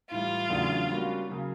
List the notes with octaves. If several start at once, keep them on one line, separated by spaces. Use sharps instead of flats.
A2 E3 G3 F4
E2 C#3 F#3 A3 D4
G3 A#3 C#4 F#4
C#3 F#3 A#3